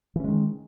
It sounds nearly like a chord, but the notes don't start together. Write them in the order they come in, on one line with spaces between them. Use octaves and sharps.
E3 C#4 G#3 D#3